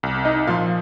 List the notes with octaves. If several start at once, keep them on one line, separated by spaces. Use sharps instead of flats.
C2
D#4 D#5
A#2 F3 F4 F5